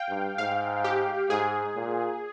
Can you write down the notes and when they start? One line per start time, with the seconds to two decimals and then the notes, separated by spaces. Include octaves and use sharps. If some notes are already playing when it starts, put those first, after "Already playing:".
Already playing: F5 G5
0.08 G2
0.38 G#2 F5
0.84 G4
1.30 G#2 G#4
1.76 A#2